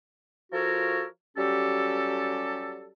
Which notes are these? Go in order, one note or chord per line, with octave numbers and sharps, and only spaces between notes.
F3 F4 F#4 A4 A#4 C#5
F#3 G3 C#4 G4 A4